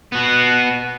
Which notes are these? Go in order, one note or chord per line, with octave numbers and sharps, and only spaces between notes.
B3 F#4